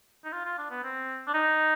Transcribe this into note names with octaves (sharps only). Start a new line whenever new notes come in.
D#4
F4
F4
D4
B3
C4
D4
D#4